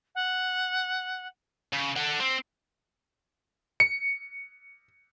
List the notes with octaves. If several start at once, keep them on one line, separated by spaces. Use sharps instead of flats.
F#5
C#3
A4 F#5
C4
C#7